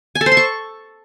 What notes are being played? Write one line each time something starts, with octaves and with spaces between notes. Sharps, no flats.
G#5
A4
C5
C6
C#6